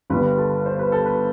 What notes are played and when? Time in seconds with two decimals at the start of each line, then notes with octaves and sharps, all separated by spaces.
0.10 G1 G2 D3 G3 B4
0.38 A4
0.66 C5
0.79 B4
0.92 A4
1.06 B4